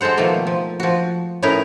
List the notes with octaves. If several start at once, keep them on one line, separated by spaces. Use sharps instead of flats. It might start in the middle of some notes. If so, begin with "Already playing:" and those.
G#3 F#4 A4 C5 F#5
B2 D#3 F3 A3 A#3
F3
F3 F#4
A2 C#4 D#4 E4 A#4 B4